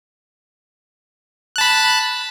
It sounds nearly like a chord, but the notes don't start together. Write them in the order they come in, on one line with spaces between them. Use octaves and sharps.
F#6 A5 B5